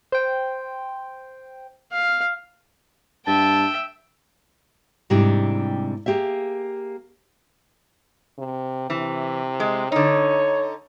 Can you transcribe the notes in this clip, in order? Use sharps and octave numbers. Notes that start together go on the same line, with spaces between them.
C5 G5
F5
G2 E5 G5 A5
G#2 C3 G3 D4 E4 G4
A#3 G4 G#4 E5
C3
C3 E3
G#3
D3 D#4 C#5